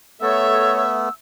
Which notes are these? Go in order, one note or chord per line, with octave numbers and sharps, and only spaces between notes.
A3 B3 A4 C#5 E5 E6